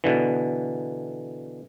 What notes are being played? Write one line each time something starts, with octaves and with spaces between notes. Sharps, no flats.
B2 D3 E3